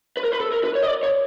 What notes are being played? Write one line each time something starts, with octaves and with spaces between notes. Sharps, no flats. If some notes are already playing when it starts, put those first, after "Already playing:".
B4
A#4
B4
A4
A#4
B4
C#5
D#5
D5
C#5